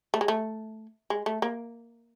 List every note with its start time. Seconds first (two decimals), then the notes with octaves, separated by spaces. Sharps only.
0.14 A3
0.21 G#3
0.28 A3
1.10 G#3
1.26 A3
1.42 A#3